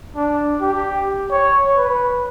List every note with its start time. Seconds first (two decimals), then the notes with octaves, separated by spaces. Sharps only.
0.16 D4
0.61 G4
1.31 C#5
1.76 B4